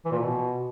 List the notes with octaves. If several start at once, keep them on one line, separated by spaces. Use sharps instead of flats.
E3
A#2
B2